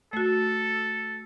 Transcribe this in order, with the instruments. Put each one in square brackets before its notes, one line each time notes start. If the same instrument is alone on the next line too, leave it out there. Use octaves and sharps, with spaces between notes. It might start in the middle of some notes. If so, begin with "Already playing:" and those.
[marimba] A3 F#4 [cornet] A4